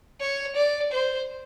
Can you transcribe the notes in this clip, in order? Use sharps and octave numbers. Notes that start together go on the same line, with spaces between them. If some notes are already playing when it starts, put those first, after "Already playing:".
C#5
D5
C5